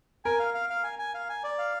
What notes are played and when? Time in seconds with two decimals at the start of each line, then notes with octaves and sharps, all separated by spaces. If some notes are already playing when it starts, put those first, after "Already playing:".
0.25 A#4 G#5
0.40 F5
0.54 F5
0.70 F5
0.84 G#5
0.99 G#5
1.14 F5
1.29 G#5
1.44 D5
1.58 F5